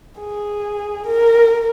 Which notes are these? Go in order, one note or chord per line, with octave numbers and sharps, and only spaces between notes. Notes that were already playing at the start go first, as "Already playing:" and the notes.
G#4
A#4